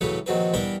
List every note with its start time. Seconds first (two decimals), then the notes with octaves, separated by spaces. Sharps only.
0.01 A2 C#3 E3 F#3 B4
0.26 A#1 D#3 F#3 C4 B4
0.54 G2 E3 B3 A#4 G5 B5